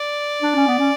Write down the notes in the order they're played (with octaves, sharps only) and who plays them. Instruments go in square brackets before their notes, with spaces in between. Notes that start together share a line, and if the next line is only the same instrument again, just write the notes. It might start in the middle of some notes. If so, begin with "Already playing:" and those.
Already playing: [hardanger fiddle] D5
[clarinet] D4
C#4
B3
C#4